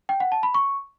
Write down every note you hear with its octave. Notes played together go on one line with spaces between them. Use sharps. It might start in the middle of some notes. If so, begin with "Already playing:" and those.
G5
F#5
A5
B5
C#6